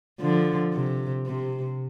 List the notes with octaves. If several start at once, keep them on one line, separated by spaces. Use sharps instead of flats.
D3 F3
C3
C3